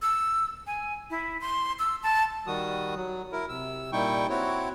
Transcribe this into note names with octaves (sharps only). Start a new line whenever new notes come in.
E6
G#5
E4
C6
E6
A5
D#3 G3 F#4 D#6
F#3
E4 A#4
C3 E6
A#2 G3 D#4 E4 G5 C#6
C4 E4 F#4 C#5